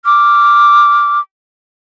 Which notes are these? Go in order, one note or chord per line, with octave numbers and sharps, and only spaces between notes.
D6 F6